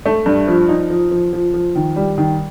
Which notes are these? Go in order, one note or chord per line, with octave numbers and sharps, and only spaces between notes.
A3
G2
F3
D#4
F3
F3
F3
F3
D#3
G3
D#3